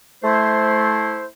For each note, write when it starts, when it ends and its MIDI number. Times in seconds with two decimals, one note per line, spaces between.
0.23 1.26 57
0.23 1.26 64
0.23 1.26 72